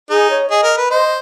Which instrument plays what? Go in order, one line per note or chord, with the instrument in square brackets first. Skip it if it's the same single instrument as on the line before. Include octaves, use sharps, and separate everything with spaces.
[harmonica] D#4 [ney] G#4
[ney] C#5
[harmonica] G#4 [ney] D#5
[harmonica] A#4
B4
[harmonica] C5 [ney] D#5